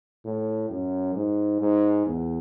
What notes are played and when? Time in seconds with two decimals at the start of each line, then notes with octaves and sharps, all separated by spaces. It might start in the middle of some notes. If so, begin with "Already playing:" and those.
0.25 A2
0.70 F#2
1.15 G#2
1.61 G#2
2.06 E2